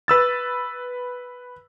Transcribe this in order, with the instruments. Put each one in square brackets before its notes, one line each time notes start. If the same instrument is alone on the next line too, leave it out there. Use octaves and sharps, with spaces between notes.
[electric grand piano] B4 E6 A6